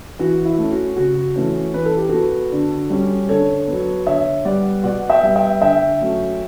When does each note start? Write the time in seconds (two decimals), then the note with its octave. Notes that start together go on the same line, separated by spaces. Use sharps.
0.19 E3 F#4
0.45 E4
0.58 A3 C#4
0.71 F#4
0.97 C#3 F#4
1.36 E3 A3 C#4
1.74 E3 B4
1.86 A4
1.97 G4
2.09 B3 F#4 A4
2.52 D3
2.90 G3 C#4
3.29 D3 A4 C#5
3.68 F#3 B3
4.06 D3 C#5 E5
4.45 G3 B3 D5 F#5
4.84 B2 D5 F#5
5.10 E5 G5
5.23 G3 B3
5.36 E5 G5
5.61 D3 E5 G5
6.01 F#3 A3 C#4